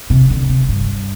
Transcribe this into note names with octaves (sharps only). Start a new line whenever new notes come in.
C3
D3
C3
G2